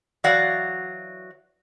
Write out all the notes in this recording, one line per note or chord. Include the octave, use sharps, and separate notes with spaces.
E3 F#3 F#4 D5 F5 F#5